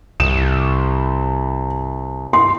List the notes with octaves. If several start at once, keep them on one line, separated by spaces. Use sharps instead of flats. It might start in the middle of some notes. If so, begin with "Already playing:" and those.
C2 E7
C6